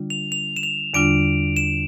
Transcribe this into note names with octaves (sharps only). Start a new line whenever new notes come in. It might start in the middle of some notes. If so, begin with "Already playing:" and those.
Already playing: D3 G3 D4 F4
F7
F7
E7
F7
E2 D3 G3 D4 F4 D7
E7